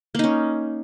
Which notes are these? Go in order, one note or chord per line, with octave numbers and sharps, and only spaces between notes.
A#3 C#4 D#4